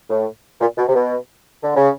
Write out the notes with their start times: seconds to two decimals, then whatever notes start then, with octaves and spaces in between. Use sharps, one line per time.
0.10 A2
0.61 A#2
0.77 B2
0.88 C3
0.95 B2
1.62 D3
1.76 C#3